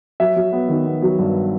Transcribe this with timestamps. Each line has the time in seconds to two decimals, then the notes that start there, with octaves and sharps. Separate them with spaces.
0.20 F#3 E5
0.36 F#3
0.52 B3
0.69 D#3
0.86 B3
1.02 F#3
1.19 G2